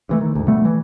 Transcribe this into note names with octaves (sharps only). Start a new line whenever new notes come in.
G2 E3 A3
D#3
D2 G#2
B2 G3 A3
E3